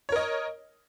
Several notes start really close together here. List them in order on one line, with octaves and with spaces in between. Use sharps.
C#5 A#4 D#5